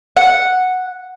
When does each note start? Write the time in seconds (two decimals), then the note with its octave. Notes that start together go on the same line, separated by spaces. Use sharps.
0.17 F#5